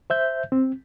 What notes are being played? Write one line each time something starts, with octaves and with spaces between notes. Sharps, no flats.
C5 E5 G6
C4